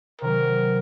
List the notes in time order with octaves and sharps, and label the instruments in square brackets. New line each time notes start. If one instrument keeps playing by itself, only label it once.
[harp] C3 D#3 F#3 [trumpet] A#4